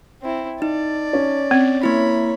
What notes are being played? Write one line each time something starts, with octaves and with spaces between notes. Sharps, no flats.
C4 E4
D#4 D5
C#4
C4
A#3 E4 C#5 B5